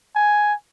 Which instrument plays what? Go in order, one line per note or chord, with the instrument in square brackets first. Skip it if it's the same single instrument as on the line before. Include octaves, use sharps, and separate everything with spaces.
[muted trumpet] G#5